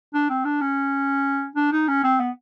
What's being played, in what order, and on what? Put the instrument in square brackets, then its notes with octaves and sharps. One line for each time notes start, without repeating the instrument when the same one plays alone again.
[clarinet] D4
C4
D4
C#4
D4
D#4
C#4
C4
B3